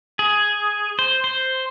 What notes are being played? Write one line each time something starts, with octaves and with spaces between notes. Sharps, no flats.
G#4
C5
C5